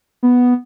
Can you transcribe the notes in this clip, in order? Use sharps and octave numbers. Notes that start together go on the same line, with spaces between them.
B3